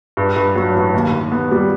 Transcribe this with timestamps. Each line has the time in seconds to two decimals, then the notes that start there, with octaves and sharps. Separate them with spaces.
0.17 G2
0.36 G2
0.56 F#3
0.75 A1
0.94 D#2
1.13 D#2
1.32 B3
1.51 G3